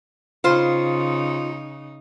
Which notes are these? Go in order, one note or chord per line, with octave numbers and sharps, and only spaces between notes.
C#3 D#4 F4 C5